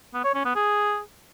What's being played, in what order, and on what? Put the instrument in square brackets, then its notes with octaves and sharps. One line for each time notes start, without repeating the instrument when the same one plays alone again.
[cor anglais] B3
C#5
C#4
B3
G#4